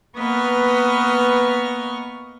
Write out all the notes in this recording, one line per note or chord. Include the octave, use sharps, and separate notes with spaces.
A#3 B3 B4 D#5 C#6 F6